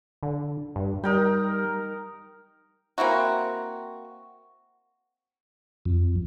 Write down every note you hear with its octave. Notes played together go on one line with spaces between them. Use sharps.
D3
G2
G3 D#4 A#4 G5
A#3 C4 E4 F#4
F2